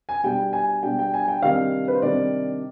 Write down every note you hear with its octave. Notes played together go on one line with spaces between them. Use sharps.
G#5
B2 G3 D4 G5
G#5
B2 G3 D4 G5
G5
G#5
G5
C3 D#3 G3 D4 F5
B4
C5
C3 D#3 G3 D4 D5